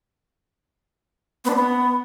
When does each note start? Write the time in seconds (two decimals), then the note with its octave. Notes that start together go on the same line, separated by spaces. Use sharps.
1.45 B3
1.50 D4
1.55 B3